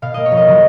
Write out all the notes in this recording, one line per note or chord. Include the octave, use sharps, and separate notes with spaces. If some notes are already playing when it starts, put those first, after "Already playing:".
B2 F5
A#3 D#5
C#5
F2
D#5
C#3 F#3